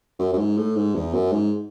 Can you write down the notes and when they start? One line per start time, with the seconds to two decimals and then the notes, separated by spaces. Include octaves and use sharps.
0.19 F#2
0.33 F#2
0.38 G#2
0.57 A2
0.76 G#2
0.95 E2
1.14 F#2
1.32 G#2